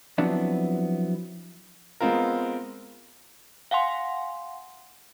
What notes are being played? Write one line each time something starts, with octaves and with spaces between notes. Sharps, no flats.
F3 F#3 B3 C4 D4 E4
G#3 B3 C4 F4 A#4
F5 F#5 G#5 C6